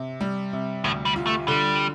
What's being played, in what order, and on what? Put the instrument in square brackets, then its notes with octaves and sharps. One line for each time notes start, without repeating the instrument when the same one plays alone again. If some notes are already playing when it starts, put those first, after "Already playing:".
Already playing: [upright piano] C3
G3
C3
[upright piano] D2 [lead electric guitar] A2
[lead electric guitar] G3
[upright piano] F4
[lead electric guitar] A3
[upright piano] D3 [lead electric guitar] G3